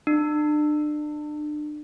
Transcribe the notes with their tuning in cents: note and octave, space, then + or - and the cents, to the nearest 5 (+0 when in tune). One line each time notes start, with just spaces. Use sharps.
D4 +35